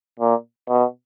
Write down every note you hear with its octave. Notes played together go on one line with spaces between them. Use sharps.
A#2
B2